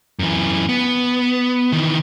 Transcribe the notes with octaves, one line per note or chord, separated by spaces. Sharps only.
F#2 E3
B3
D#3 E3